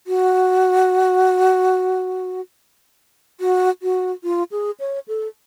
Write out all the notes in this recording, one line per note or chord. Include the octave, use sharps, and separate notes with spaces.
F#4
F#4
F#4
F4
G#4
C#5
A4